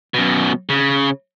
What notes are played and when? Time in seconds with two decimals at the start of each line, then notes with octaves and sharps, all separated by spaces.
0.14 F#2 B2
0.69 C#3